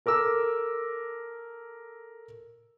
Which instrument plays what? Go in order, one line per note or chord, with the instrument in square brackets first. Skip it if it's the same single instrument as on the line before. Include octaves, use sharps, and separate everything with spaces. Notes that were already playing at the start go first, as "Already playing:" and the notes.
[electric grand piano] A4 A#4 D6 E6